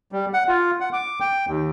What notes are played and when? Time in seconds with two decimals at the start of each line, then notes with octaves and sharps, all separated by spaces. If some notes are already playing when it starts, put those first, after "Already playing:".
0.12 G3
0.34 F#5
0.48 F4
0.80 F#5
0.93 D6
1.20 G5
1.47 D#2